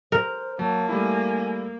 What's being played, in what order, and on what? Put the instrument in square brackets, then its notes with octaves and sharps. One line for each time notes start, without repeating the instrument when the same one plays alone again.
[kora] A#4 [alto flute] C5
[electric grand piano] F#3 [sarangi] A#3 [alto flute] A5
[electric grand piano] G3 A3 E4 [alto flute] G#5